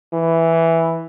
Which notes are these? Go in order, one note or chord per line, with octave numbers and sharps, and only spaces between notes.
E3